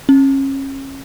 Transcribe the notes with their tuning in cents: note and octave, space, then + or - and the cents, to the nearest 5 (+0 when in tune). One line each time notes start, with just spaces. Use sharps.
C#4 -30